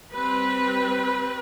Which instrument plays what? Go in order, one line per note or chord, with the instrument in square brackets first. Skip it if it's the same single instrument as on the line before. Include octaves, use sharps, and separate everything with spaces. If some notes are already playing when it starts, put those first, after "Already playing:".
[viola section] G3 C4 B4